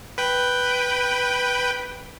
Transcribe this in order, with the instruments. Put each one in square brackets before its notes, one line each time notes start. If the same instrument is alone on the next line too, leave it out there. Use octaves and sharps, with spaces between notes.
[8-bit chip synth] B4 G5